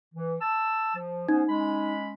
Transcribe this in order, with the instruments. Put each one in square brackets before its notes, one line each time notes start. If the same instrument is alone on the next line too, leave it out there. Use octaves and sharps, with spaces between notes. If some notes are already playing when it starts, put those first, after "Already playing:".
[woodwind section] E3
A5 E6
F3
[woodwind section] B3 C#4 C5 [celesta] D#4
[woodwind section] G#3 C#4 B5